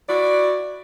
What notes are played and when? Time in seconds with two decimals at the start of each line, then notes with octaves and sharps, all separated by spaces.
0.09 E4 F#4 D5